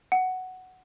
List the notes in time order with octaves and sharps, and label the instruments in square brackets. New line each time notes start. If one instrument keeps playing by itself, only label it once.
[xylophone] F#5